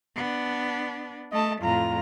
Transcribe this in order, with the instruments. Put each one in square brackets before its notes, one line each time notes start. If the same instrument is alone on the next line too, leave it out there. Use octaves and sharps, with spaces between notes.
[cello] B3 D4
[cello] A3 [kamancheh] D#5 A5
[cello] F2 A2 [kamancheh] F4 A#5